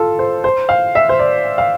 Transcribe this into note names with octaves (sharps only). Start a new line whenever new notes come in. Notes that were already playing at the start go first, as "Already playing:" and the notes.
Already playing: F4 A4
C5
C5
F5
E5
C5
D5
F5